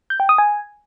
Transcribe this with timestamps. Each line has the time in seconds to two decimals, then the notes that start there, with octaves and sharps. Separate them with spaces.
0.10 G6
0.20 G5
0.29 D#6
0.38 G#5